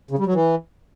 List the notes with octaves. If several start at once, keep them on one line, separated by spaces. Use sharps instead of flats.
C#3
G3
F#3
E3